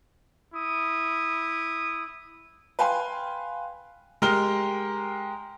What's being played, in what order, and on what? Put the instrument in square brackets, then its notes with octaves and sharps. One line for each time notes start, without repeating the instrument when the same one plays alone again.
[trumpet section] E4 D#6
[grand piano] B4 F5 G5 G#5 C6
G#3 G4 A#4 F6 G7